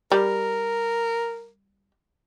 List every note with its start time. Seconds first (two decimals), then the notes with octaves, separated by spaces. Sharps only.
0.12 G3 A#4